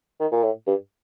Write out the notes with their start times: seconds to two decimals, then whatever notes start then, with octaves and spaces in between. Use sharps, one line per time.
0.20 D#3
0.32 A#2
0.44 A2
0.67 G2